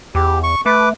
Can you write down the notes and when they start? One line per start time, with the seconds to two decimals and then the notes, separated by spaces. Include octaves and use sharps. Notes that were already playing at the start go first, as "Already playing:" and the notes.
0.15 E2 G4
0.43 C#6
0.66 A3 B4 D6